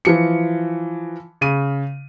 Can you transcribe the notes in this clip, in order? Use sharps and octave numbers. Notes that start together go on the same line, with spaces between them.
E3 F3 C#7
C#3 D#7